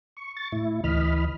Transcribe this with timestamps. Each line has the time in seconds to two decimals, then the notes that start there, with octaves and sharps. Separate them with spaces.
0.17 C#6
0.37 C#6 A6
0.52 A2 E4
0.84 D2 E3 D#5 B5 F6